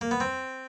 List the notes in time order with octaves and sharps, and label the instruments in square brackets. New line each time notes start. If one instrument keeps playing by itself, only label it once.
[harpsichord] A#3
B3
C4